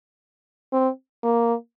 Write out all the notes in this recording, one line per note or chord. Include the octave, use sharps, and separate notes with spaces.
C4
A#3